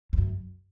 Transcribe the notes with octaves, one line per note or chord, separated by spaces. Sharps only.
F2
F#2